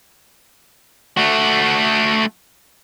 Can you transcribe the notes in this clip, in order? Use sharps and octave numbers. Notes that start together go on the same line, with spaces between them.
A3 F#4